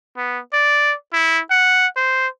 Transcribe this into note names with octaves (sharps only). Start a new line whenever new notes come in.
B3
D5
E4
F#5
C5